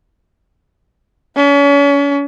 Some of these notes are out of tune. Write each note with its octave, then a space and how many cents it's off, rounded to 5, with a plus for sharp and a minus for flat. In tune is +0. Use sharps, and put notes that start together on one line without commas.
C#4 +35